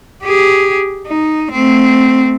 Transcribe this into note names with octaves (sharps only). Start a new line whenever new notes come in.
G4 G#4
D#4
A3 C4